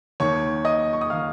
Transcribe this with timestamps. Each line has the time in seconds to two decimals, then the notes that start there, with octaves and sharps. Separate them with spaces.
0.20 D#2 D#3 C#5 C#6
0.65 D#5 D#6
0.93 C#6
1.01 D#6
1.10 D#3 F5 F6